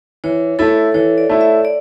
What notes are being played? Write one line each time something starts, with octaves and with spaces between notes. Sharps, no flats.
E3 C#5
A3 E4 A4
E3 C#5
D5
A3 E4
E5
D5